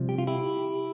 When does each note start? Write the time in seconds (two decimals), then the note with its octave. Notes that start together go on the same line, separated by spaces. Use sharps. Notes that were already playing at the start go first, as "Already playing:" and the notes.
Already playing: C2 C3 F3
0.09 G4
0.18 F4
0.27 E4 G4